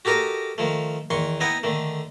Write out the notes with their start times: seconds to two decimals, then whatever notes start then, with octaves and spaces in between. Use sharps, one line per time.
0.05 F#4 G4 A4 A#4 D#5
0.58 D#3 F3 A3
1.10 E2 D#3 C6 C#6
1.40 B3 D#4 E4 D#5 F#5 G5
1.63 D3 D#3 A3